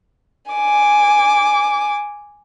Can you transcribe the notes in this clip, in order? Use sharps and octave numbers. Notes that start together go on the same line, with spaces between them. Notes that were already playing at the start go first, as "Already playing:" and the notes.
G#5 D6